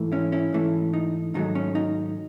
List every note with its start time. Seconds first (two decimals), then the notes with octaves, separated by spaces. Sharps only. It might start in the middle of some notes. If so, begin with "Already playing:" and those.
Already playing: G#2 E3 A3
0.12 C#4 E4
0.32 C#4 E4
0.53 G#2 E3 A3
0.93 D#4
1.34 G#2 D#3 F#3 A3 D#4
1.55 C#4
1.75 D#4